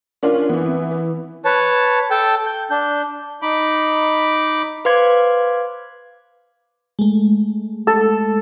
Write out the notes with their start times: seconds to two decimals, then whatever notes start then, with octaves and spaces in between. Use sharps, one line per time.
0.23 C#4 D4 F4 A#4
0.49 E3 B3
0.66 C4
0.91 B4
1.45 B4 C#5 A5
2.11 A4 G5 A5
2.46 G6
2.71 D4 G6
3.42 D#4 B5 D6
4.85 B4 C5 F5 C6 D6 G#6
6.99 G#3 A3
7.87 A4